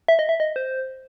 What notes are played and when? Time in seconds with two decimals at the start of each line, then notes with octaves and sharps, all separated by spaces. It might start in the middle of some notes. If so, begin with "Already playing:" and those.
0.08 E5
0.19 D#5
0.29 E5
0.40 D#5
0.56 C5